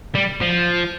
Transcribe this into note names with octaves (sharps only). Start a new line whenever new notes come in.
G3
F3